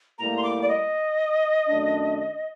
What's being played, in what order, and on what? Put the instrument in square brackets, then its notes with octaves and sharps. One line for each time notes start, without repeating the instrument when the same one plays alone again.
[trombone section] A2 G3 A#3 [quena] A#5
[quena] C6
D6
D5
D#5
[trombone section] F#2 D#3 A3 D4